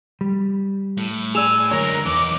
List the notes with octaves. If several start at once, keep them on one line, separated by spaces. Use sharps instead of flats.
G3
A2
G#4 D5 G#5 E6 E7 F7
F#2 D3 G#3 A#4 C#5
E2 B3 D#4 D6